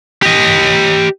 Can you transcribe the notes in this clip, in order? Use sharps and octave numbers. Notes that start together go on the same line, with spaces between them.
G4 D#5